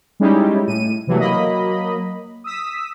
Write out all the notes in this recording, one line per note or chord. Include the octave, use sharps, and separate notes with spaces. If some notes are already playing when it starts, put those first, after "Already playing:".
G3 G#3 C#4 D#4 E4 G4
A2 D#7
C3 E3 F#3 G3 A3
F#3 A#3 D#5 B5
D#6 E6 B6